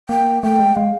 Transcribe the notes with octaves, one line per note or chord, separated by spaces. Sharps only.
A#3 G5
A3 G5
G#3
G#3 F5